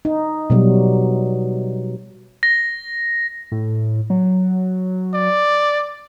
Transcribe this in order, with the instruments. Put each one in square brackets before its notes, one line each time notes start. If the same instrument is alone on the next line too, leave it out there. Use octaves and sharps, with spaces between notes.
[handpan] D#4
B2 F#3 G3
[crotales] A#6
[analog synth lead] A2
F#3
[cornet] D5